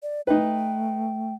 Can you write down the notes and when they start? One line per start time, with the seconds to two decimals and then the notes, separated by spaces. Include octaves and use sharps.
0.03 D5
0.27 A3 D#4 B4 G5